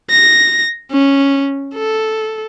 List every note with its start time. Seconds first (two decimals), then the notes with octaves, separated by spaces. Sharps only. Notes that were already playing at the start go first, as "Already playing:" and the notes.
0.10 A#6
0.91 C#4
1.74 A4